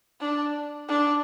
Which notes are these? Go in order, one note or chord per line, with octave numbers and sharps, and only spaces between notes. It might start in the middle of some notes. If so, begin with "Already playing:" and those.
D4
D4